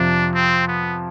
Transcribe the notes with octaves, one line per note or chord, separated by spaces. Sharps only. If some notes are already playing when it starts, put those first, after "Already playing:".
Already playing: F2 C3 F3 D4
C4
B3